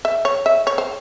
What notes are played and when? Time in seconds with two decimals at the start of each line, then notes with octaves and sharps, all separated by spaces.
0.05 E5
0.25 C#5
0.46 E5
0.67 C#5
0.78 C5